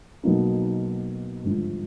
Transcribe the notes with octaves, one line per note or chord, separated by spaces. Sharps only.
B1 B2 F#3 A#3 D#4
G#1 G2 D3 F3